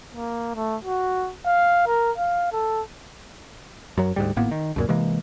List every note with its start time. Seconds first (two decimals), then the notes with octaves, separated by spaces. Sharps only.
0.15 A#3
0.55 A3
0.85 F#4
1.46 F5
1.87 A#4
2.18 F5
2.53 A4
3.98 F#2 F#3
4.16 D2 G#2 G3
4.37 G#1 A2 A#3 B3
4.51 D#3
4.76 C#2 F#2 A#2
4.89 C3 E3 G#3 A#3